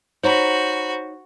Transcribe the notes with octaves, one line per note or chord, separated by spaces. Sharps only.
D#4 F#4 C5 C#5 A#5 B5